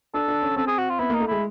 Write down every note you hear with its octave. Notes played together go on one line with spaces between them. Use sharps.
D4 A4
D4
C#4
C4 A4
G#4
F#4
F4
B3 E4
A#3 D#4
A3
G#3 E4